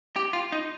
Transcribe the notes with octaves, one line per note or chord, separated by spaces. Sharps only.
G4
F4
D#4